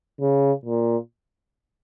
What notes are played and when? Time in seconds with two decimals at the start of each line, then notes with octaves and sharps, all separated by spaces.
0.21 C#3
0.65 A#2